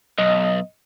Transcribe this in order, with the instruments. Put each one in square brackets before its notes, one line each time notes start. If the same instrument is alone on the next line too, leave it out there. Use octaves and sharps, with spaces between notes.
[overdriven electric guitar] B1 [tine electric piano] D#5